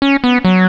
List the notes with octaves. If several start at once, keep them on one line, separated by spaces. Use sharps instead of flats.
C#4
B3
F#3